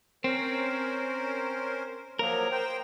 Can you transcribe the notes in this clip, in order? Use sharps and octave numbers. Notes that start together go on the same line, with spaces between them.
C4 C#4 A#4 C5
F3 F#3 A#3 A#4
C5 G5